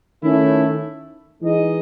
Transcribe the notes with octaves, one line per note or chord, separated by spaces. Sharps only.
D#3 A3 C#4 E4
E3 G#3 D#4 G#4 D#5